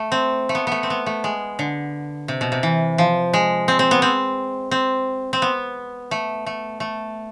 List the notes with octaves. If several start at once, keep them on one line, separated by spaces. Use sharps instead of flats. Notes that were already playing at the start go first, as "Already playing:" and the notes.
Already playing: A3
C4
A3
B3
A3 B3
C4
B3
A3
G#3
D3
C3
B2
C3
E3
F3
G#3
C4
C4
B3
C4
C4
C4
B3
A3
A3
A3